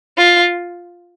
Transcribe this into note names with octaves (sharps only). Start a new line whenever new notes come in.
F4